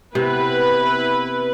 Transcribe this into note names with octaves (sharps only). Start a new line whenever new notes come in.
C3 B3 E4 B4